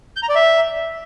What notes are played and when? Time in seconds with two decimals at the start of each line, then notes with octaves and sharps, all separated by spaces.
0.16 G6
0.23 A#5
0.29 D5
0.35 E5